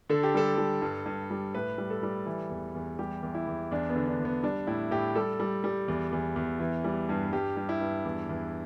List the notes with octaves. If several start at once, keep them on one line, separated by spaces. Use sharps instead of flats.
D3 A4
G4
G3 A4
G3
G2
G2
G3
A2 B4
G3
A4
G3
E3
E2
E2
G3 G4
E2
E4
E2
E2 D4
B3
D3
D4
E2
B3
G3 D4
A2 E4
A2 G4
G3 A4
G3
G3
E2
E2
E2
E3
G3
G2
G2 G4
G2
E4
G2
E2
E2